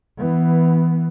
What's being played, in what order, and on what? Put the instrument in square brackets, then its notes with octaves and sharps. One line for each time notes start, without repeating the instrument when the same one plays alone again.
[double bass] E3 B3